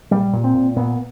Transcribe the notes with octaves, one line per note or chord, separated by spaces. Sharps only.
A#2 G3
A#2
C4
A#2
A#2 B3